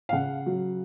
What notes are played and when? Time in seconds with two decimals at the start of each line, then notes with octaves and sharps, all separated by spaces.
0.09 F5
0.12 C#3 F#5
0.46 F#3